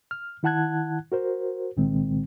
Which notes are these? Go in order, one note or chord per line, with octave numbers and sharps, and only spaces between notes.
F6
D#3 E4 F#5 A5 F#6 G#6
F#4 A#4 C5
C2 A#2 D#3 G#3 C4